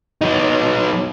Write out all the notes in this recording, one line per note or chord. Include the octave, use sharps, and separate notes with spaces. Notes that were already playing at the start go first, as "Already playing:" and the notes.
F#3 D#4